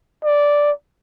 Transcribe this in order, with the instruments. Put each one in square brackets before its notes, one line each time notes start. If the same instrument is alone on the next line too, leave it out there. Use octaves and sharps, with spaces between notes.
[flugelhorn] D5